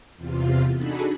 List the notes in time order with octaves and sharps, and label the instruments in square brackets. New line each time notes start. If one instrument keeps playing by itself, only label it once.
[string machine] E2 C3 F4
D4 D#4 F#4 G#4 A4 B5